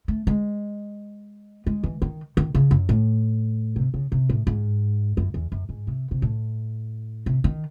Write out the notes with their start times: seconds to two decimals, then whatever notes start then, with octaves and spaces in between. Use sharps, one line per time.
0.08 A3
0.27 G#3
1.66 G#3
1.83 E3
2.02 D#3
2.37 D#3
2.55 C#3
2.71 F#2
2.89 A2
3.76 C3
3.94 C#3
4.12 C3
4.29 A2
4.47 G#2
5.17 F#2
5.34 E2
5.52 F#2
5.69 G#2
5.87 C3
6.11 C3
6.22 A2
7.26 C3
7.44 D#3